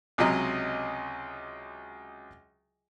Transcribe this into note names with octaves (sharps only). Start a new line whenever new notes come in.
C#2 C3 F#3 D#5 A#5